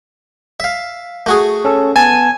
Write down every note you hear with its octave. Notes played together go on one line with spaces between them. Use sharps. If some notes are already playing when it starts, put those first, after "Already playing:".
E5 F5
A3 F#4 G#4
C#4 A4
B3 G#5 A5 A6